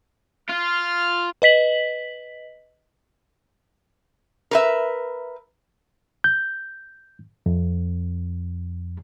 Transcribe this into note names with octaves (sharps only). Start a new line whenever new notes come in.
F4 F6
B4 D#5 B6 F#7
A#4 B4 E5
G6
F2